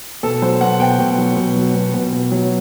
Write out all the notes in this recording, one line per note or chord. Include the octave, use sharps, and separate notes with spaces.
B2 A4
F#3 C5
B2 F#5
B2 G5
B2
F#3
B2
F#3
B2
B2
B2
F#3